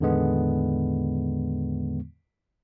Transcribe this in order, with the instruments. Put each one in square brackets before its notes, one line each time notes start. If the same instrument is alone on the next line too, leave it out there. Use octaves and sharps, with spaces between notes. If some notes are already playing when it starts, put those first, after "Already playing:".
[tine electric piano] E2 A2 D3 D#3 G#3 B3